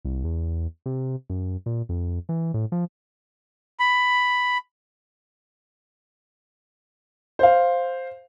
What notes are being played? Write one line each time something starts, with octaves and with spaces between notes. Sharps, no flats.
C2
E2
C3
F#2
A#2
F2
E3
A2
F3
B5
C5 F5